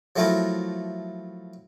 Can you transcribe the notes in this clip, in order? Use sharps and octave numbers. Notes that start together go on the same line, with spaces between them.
F3 F#3 A3 E4 A#4 G5